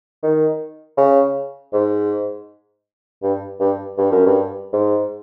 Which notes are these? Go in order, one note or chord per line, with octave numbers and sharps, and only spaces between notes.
D#3
C#3
G#2
G2
G2
G2
F#2
G2
G#2